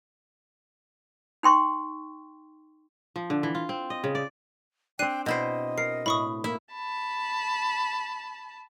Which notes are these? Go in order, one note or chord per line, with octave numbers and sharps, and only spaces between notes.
D#4 G5 C6 C#6
F3
D3
E3
F4
C4
D#5
C#3
D5
C4 D4 G5 F#6 C7 D#7
B2 E4 C5 D#5
A#4 C7
A2 B5 C#6 D#6
A#3 E4 E5
A5 B5